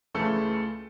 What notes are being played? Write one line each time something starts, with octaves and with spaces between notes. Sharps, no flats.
C#2 C#3 E3 A3 A4